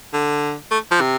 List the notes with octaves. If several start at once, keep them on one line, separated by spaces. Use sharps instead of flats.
D3
A3
F3
C3